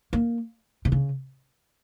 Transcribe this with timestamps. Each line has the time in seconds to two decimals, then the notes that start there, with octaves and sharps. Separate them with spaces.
0.13 A#3
0.85 C3
0.92 C#3